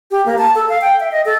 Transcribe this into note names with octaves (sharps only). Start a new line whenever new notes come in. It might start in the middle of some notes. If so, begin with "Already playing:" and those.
G4
A#3
A5
A4
F5
G5
E5
D#5
A4